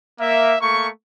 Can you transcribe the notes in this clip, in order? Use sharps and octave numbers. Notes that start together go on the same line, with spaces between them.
A#3 E5
A3 A#3 C#6